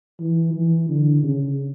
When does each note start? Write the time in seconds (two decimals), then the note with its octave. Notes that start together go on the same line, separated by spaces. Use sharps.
0.20 E3
0.54 E3
0.89 D3
1.23 C#3